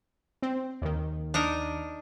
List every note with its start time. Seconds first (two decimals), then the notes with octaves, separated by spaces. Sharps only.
0.42 C4
0.82 D#2 D#3
1.34 D4 D#4 A#4